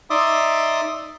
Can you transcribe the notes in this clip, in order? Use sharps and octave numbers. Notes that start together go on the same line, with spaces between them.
D#4 D5 E5 C6 D6 D#6